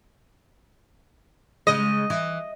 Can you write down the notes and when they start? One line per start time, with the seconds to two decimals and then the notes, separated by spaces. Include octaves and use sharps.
1.67 C#3 G#3 D#5
2.10 E3